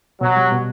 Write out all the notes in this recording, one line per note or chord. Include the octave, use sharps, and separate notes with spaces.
B2 F#3
G3
B2